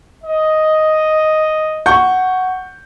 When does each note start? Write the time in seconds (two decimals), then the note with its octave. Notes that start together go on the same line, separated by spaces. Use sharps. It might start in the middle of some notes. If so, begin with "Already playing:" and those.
0.24 D#5
1.86 F#5 C#6 G6